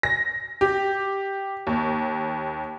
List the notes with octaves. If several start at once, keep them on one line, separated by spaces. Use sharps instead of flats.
A#6
G4
D#2